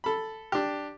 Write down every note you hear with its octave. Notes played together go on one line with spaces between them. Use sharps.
A4 B5
D4 G4